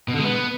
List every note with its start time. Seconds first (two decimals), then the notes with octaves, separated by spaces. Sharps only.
0.08 B2
0.13 D3
0.19 G#3
0.24 B3